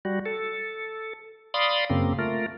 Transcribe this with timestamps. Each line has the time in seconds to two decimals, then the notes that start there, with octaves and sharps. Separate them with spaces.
0.05 G3 F#4
0.26 A4
1.54 D5 F5 B5 C6 D#6
1.90 F#2 C#3 A#3 C4
2.19 A3 F4 A#4